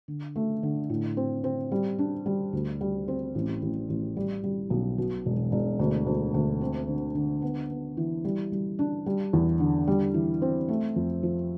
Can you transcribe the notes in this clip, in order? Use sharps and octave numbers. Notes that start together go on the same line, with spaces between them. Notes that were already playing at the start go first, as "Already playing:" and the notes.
D3
A3
D3
A2
C4
C4
G3
D4
G3
D2
G3
C4
A1
A1
A1
G3
G3
B1
B2
E1
E1
D2
D2
D2
C4
D3
D3
B3
B3
E3
G3
G3
D4
G3
E2
D3
G3
E3
C4
A3
F2
F3